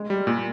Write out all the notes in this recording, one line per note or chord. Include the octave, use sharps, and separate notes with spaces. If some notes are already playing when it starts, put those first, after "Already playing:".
Already playing: G#3
G3
A#2